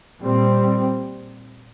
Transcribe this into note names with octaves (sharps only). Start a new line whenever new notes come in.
A#2 G3 C4